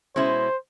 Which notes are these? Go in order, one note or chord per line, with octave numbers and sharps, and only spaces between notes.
B2 G#3 C#4 E4 C5